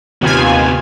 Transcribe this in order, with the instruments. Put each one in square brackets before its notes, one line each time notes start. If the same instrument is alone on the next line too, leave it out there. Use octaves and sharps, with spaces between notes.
[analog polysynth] D#2 F4 G#5 [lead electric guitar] C3 B3